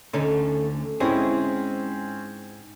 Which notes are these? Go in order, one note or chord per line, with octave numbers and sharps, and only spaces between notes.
D2 D3 A3 C#4 D#4
G#2 C4 C#4 E4 G#4